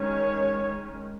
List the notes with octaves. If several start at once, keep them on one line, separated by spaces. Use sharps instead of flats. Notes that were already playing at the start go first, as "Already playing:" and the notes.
Already playing: D#3 G#3 C#4 C#5